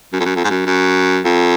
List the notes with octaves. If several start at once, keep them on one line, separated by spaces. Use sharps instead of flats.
F#2
F2
F#2
F2
G#2
F#2
F#2
F2